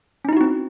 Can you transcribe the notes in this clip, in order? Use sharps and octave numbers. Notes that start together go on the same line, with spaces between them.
C4 C#4 D#4 E4 F#4